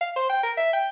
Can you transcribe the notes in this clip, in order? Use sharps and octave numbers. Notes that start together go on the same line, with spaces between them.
F5
C5
G5
A#4
E5
G5